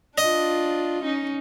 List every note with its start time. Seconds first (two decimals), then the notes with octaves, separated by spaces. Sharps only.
0.18 D4 F4 D#5
1.03 C#4 D#4